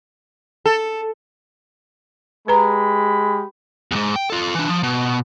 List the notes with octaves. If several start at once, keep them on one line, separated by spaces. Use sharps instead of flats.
A4
G#3 G4 B4 A#5 B5
E2 G#2
G5
F4 A4
E3 D4
F3
B2